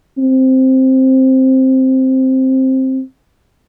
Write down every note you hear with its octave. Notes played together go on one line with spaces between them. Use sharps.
C4